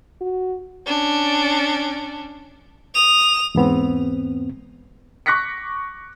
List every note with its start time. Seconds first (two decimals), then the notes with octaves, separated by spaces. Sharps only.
0.21 F#4
0.86 C#4 D4
2.94 D#6 F7
3.55 E2 G#2 B3 C4
5.26 C#6 D6 F#6 A#6 B6 C#7